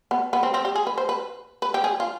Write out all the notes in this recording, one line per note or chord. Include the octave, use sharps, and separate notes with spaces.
B3
B3
C4
C4
G4
G#4
B4
C5
B4
B4
G4
G#4
F4